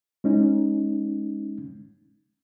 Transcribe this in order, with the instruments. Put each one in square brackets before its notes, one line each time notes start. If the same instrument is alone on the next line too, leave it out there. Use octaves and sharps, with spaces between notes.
[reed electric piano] G#3 C#4 D#4